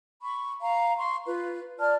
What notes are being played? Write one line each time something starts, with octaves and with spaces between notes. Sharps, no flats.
B5 C#6
F5 A#5
C6 C#6
F4 B4
D5 A5 F6